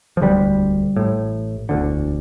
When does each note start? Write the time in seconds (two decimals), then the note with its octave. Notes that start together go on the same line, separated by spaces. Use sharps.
0.17 F3
0.21 E1 D2 D3 G3
0.96 A1 A2
1.69 E1 D2 D3